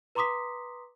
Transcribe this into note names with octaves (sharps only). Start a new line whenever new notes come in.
B4 A#5 C6 D6 D#6 B6